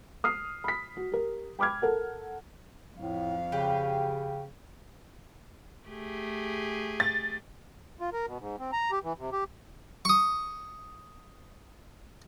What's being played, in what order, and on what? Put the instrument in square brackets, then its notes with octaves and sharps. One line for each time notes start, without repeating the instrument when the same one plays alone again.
[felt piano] D#6 F6 C7
B5 B6
F#4
G4 A#4
G5 B5 D6 F6 G#6
A4 A#4 F#5
[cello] F2 F5 [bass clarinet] A2
[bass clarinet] C#3 [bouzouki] G4 B4 C#5
[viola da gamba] A3 G4 G#4
[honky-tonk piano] A6
[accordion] F4
A#4
B2
G#2
C4
A#5
G4
E3
C3
G4
[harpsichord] C#6 D#6